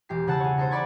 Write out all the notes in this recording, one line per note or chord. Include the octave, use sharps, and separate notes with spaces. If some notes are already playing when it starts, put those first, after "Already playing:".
E1 G4 C7
C#3 F#5 A5 E6
G#4 C#5
D#4 A4 C5
D5 B5 C#6 G#6 A6